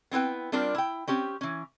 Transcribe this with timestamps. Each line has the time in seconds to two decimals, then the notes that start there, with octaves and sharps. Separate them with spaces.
0.11 B3 C4 E4 B4 G5
0.52 G3 C4 D4 F4 A#4
0.75 E4 G5
1.07 C4 C#4 G4
1.41 E3 C#4